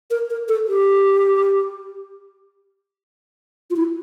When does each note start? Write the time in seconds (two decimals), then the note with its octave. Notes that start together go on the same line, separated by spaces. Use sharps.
0.11 A#4
0.30 A#4
0.48 A4
0.68 G4
3.71 F4
3.76 E4